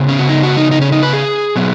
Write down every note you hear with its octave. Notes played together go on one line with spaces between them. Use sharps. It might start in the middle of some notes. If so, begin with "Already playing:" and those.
Already playing: C#3 B3
C#4
F#4
D#4
F#4
D#4
D#4
C#4
D#4
B4
G#4
B2 F#3 B3